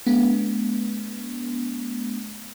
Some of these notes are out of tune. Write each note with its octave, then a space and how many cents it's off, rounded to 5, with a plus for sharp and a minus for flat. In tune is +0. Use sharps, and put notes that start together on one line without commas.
G#3 +40 B3 -25 D4 -40